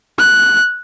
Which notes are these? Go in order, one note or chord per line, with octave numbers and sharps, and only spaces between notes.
F#6